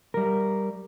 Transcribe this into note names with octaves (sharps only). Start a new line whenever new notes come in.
G3 A#4